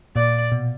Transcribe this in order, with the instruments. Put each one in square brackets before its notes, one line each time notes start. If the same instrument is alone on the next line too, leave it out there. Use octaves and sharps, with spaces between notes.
[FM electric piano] A#2 [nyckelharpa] D5
[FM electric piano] B2